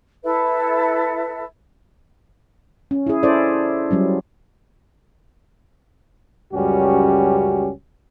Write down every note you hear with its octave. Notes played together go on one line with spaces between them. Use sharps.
E4 A4 B4 E5
C#4
E4 G#4
C#4 E4 A4 C5 D5
F#3 G3 C#4
C#2 F#2 G3 C#4 F#4 G4